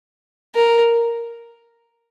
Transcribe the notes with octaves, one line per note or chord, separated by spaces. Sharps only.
A#4